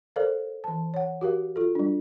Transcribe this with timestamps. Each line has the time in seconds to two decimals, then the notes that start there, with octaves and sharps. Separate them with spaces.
0.16 A4 A#4 C5 D5 F5
0.64 E3 A5
0.94 C#5 F#5
1.21 F#4 G4 A#4 F5
1.56 F4 A4
1.75 G3 D4